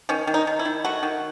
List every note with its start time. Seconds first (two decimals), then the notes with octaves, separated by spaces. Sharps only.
0.09 D#3 C#4
0.27 D#3
0.34 D#4
0.47 D#3
0.59 E4
0.65 D#3
0.84 A3 F#4
1.03 D#3